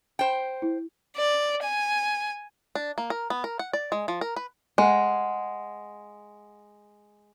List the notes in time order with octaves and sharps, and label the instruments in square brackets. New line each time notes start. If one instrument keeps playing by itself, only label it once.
[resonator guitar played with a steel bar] C5 G5
[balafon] E4
[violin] D5
G#5
[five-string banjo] D4
A#3
A#4
B3
A#4
F#5
D5
G#3
F3
A#4
B4
[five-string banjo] G#3 [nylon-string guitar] D#5 F5 F#5